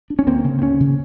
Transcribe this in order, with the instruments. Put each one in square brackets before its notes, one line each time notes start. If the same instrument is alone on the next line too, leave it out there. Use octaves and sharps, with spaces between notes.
[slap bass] D4
C#4
D2 A#3 C4
C#3
C4
D2 B3 C#4
C#3